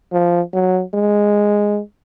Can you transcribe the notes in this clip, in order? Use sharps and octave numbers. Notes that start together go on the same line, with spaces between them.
F3
F#3
G#3